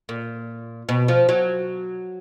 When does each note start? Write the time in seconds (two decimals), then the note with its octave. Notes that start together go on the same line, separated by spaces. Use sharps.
0.09 A#2
0.89 B2
1.08 F3
1.29 F#3